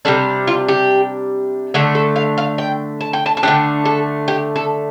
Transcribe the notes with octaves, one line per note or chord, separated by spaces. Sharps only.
C3 G3 D4 A4
F4
G4
D3 A3 D4 A4
A4
F5
F5
G5
A5
G5
A5
A5
D3 A3 D4 G5
A4
G4
A4